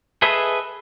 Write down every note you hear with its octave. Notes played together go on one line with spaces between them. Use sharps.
G#4 A4 B4 D#5 E5